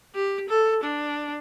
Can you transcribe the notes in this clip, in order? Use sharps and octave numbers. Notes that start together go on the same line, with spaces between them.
G4
A4
D4